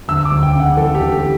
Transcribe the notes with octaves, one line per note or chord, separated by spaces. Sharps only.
D2 E6
D6
D2
G5
C#3
F#5
E3 A4
G4
D2
G4